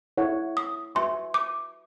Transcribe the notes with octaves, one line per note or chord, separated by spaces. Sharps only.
E4 A4 C#5 F#5 A5
D#6
F#4 B4 E5 G#5 C6 C#6
D6